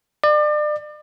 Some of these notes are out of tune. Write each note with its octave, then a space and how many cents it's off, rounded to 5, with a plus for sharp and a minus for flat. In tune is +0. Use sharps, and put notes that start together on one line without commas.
D5 +35